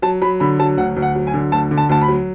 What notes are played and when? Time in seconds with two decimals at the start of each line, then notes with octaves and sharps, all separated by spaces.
0.02 F#3 A5
0.22 F#3 B5
0.40 D3 B5
0.59 F#3 A5
0.77 D2 F#5
0.96 D2
1.02 F#5
1.15 F#3
1.27 G#5
1.34 D3
1.52 D2 A5
1.71 D3
1.78 A5
1.89 D2 A5
2.02 B5
2.08 F#3